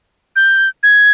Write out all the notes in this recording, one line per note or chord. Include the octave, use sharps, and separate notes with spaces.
G6
G#6